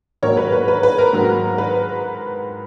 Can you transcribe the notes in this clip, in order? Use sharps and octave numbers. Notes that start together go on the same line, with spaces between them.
G#2 D#3 F#3 A#3 A#4 C#5
B4
B4
B4
B4
A#4
G#2 D#3 F#3
B4